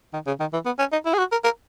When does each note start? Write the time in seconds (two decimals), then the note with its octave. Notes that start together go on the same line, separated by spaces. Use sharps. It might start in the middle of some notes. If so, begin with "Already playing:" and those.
0.13 D#3
0.27 C#3
0.40 D#3
0.53 E3
0.66 B3
0.79 C#4
0.92 D#4
1.05 E4
1.14 G#4
1.18 F#4
1.32 A#4
1.44 A#4